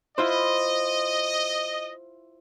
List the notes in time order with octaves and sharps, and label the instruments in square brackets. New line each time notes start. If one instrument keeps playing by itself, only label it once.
[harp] E4 F4 C5 [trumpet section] D#5